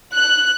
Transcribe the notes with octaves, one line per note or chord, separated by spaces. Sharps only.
F#6